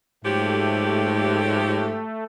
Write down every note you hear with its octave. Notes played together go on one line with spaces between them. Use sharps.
G#2 F3 F#3 A3 G4